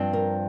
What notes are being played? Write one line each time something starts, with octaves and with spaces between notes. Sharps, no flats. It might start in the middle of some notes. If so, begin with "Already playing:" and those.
Already playing: G2 F3 C4
A#4